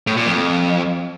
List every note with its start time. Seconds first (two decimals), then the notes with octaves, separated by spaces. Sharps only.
0.07 A2
0.17 A#2
0.26 F2